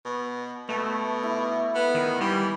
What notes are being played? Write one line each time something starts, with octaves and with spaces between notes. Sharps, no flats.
B2
B2 A3
E4 D6
B3
D#3
E3 G3